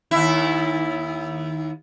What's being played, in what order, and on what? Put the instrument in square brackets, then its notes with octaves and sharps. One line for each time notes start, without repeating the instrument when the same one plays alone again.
[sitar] D#2 E4